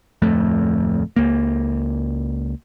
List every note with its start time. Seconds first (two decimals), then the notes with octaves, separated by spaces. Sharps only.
0.22 D1 F2 A3
1.16 C#2 A#3